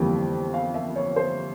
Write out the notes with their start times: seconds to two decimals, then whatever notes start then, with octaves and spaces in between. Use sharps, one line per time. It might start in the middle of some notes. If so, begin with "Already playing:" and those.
Already playing: G1 F2 E3 G3 A#3 G5
0.54 F5
0.74 E5
0.96 C#5
1.16 C5